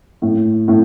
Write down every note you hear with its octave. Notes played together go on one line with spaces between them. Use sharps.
A2
A2